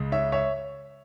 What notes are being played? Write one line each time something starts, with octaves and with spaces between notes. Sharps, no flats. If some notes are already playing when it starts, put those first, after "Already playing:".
Already playing: C#2 C#3 G#3
C#5 E5
C#5 E5